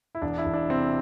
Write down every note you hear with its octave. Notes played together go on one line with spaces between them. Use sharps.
E4
E1 D4
E4
E1
D4
C3 C4